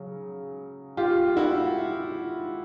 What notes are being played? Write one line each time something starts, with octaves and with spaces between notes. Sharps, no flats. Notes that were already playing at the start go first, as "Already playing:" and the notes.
Already playing: C#3 F#3
F4 G4
E4 F#4